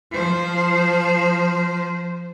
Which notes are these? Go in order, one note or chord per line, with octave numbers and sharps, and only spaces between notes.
F3 C5